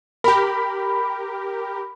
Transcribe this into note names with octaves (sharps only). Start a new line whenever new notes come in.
G4 A#4 B5